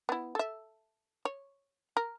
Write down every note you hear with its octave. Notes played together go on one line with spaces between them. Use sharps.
B3 E4
A4 E5
C#5
A#4